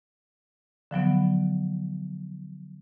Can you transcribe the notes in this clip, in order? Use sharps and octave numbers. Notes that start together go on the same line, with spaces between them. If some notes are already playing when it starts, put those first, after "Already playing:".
D3 F3 F#3 B3